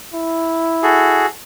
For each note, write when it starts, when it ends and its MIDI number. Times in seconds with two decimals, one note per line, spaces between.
0.14 1.27 64
0.83 1.26 66
0.83 1.26 68
0.83 1.26 69